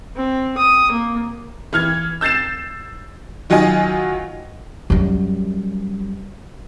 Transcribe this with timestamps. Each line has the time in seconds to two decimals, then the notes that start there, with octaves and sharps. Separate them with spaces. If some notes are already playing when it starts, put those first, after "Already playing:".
0.16 C4
0.58 D#6
0.91 A#3
1.73 E3 F6 G#6
2.21 E6 G6 A6 C7 E7
3.50 D#3 F#3 F4 D#5 G#5
4.90 F#2 G3